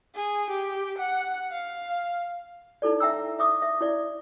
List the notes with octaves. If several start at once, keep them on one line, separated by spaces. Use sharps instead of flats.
G#4
G4
F#5
F5
D#4 E4 A4 D5
E5 G5 A#5 E6
E5 D6 D#6
E5
E4 D5